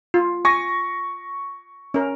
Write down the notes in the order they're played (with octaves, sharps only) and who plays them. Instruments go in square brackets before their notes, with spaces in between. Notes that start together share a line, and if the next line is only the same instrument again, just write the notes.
[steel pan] F4
[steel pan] G#5 [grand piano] C#6 A#6
[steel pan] C#4 A#4